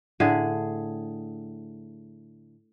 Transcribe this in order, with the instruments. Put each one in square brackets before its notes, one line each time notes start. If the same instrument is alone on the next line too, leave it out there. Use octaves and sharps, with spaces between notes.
[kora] A2 D3 G#4